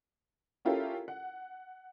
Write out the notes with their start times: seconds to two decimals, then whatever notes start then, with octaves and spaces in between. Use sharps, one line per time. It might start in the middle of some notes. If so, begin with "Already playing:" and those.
0.65 C#4 E4 F4 G4 A4 A#4
1.08 F#5